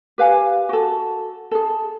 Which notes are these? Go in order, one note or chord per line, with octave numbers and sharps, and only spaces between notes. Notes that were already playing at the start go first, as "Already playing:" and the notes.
G4 B4 F5 G#5
F#4 A4
G#4 A4